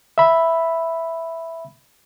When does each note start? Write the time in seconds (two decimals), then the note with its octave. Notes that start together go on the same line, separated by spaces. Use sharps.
0.18 E5 B5